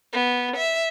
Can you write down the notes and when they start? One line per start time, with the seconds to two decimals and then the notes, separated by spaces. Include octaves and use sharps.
0.13 B3
0.57 E5